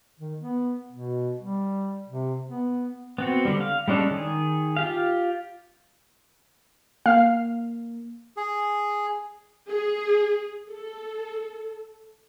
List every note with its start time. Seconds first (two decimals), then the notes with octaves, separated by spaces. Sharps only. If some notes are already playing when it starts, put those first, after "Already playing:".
0.20 D#3
0.40 B3
0.91 B2
1.39 G3
2.09 C3
2.48 B3
3.18 B3 C4 F#4
3.45 D3 G3
3.61 F5
3.88 G3 G#3 C#4 D4 A4
4.11 D#3 G#4
4.77 F4 G4 F5
7.06 A#3 F5
8.37 G#4
9.69 G#4
10.71 A4